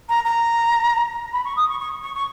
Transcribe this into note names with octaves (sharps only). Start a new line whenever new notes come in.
A#5
A#5
B5
C#6
D#6
C#6
C#6
C#6
C#6